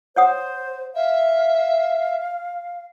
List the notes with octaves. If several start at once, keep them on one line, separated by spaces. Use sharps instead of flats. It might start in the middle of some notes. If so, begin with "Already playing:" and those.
C5 C#5 F#5 D#6
E5 F5